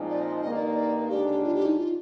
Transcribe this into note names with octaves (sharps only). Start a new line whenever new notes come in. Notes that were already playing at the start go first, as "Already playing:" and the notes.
Already playing: A#2 F3 G#3 C4 D#4
D5
D#5
G2 D#3 A#3 D#4 D#5
D5
D#5
D5
D#2 D3 G#3 D4 G4
F4
G4
D#4
F4